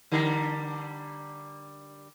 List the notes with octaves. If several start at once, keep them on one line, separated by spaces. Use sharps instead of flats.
D3 G3 A#4